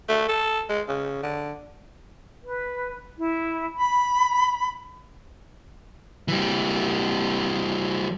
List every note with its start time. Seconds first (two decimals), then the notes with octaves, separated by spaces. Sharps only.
0.09 A3
0.29 A4
0.69 G#3
0.89 C#3
1.23 D3
2.43 B4
3.17 E4
3.75 B5
6.28 E3 G3